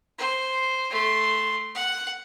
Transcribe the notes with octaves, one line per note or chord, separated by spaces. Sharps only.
C5
A3 C6
F#5